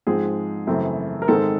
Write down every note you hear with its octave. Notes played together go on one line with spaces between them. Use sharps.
G#2 F3 G#3 C4 G#4
F#2 C#3 E3 A3 C4
A#4
G#2 D#3 G#3 C4 A4